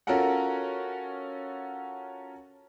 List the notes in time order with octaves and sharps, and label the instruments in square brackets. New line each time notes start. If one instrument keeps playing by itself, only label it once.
[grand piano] C#4 F4 F#4 A4 A#4 F#5